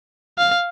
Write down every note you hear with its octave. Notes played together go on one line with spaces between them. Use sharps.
F5